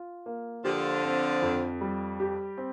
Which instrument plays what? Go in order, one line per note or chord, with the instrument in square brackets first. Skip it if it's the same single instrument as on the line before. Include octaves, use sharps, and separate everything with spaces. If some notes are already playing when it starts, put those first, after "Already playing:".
Already playing: [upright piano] F4
A#3
[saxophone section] D3 F3 [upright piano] G4
[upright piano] C4
F2
G3
G4
C4